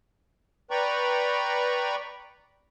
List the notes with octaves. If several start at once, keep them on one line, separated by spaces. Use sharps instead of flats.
B4 D5 G5 A#5 B5 C#6